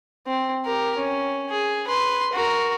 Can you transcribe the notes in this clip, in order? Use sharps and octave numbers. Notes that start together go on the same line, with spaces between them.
C4
G4 A#4
C#4
G#4
B4 C6
F#4 A#4